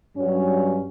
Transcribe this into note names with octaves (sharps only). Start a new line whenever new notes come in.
G2 F#3 C#4